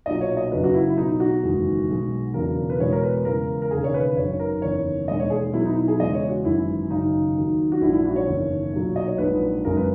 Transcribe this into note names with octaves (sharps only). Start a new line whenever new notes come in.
B1 A#2 F#3 D#5
C#5
D#5
F#1 F#2 C#3 F#3 B4
F#4
E4
E4
B1 B2 F#3 D#4
F#4
F#1 E2 D#3 G#3
B1 B2 G#3
E1 E2 C#3 F#3 A#4
B4
E2 B2 G#3 C#5
A#4
B4
E2 C#3 G#3 A#4
A#4
E1 D#2 C#3 G#4
C#5
B4
G#1 F#2 D#3 C#5
A#4
F#1 E2 D#3 C#5
E1 D#2 D#3 G#3 D#5
C#5
G#4
B1 B2 F#3 E4
D#4
E4
G#4
E2 C#3 G#3 D#5
C#5
F#4
G#1 F#2 E3 G#3 E4
G#1 F#2 C#3 D#4
D#2 D#3 F#3
F#4
A#1 G#2 F#3 E4
E4
F#4
C#5
F#1 E2 D#3
B1 A#2 F#3
D#5
C#5
A#1 G#2 F#3 B4
F#1 F#2 C#3 G#3 A#4
B4